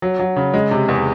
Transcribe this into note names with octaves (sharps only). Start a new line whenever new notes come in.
F#3
F#3
C#3
G#3
C3
E2